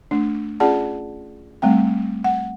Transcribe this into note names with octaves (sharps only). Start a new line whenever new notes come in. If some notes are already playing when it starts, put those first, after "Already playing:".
A3 D4
C#4 F4 G#4 D5 F#5 A5
G3 A3 C4 G5
F#5